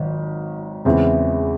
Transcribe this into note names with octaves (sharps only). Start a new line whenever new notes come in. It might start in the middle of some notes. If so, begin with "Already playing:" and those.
Already playing: G#1 D#3 F#3
E2 C#3 E3 G#3 C4